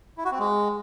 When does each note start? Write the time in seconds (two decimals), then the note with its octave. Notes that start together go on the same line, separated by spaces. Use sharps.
0.18 E4
0.25 F#4
0.32 C4
0.39 G#3